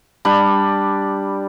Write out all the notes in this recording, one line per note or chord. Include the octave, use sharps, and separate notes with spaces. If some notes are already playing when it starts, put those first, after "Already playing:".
G3 D4 B5